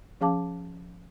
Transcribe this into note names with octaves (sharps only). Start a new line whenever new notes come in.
F3 C#4 G#4 F5 A5 D6